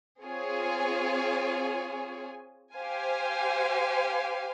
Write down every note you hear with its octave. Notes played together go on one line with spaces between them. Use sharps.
C4 F4 G#4 C#5 G#5
G4 C5 F5 G#5